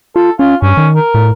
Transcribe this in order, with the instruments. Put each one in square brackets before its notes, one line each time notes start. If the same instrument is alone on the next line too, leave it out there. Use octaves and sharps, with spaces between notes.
[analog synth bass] F4 [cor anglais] A4
[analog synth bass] C#4 [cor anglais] F4
[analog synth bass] G2 [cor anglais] C#4
[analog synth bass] D#3
[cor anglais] A#4
[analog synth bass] A2